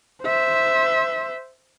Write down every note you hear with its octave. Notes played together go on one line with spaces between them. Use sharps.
C5 E5